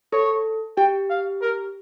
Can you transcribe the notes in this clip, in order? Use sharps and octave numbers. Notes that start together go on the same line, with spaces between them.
A4 C#5
G4 G5
F5
A#4